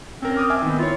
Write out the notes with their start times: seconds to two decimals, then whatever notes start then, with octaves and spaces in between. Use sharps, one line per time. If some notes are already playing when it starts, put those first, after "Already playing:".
0.22 C4 C#4 A#4
0.37 D6 D#6 F6
0.50 E5 G#5 D6
0.62 D#3 B3
0.79 E4 F4 C#5